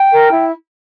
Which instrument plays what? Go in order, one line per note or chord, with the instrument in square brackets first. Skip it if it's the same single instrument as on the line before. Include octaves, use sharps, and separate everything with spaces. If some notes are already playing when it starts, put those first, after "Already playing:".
Already playing: [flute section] G5
A#4
E4